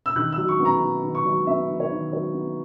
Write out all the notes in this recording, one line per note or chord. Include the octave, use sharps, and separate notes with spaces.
E6
D#3 F#6
E6
F#3
C#6
B3
A#5
D#3
D#3
C#6
F#3
B3 E5
D#3
C#5
D#3
F#3 C#5
B3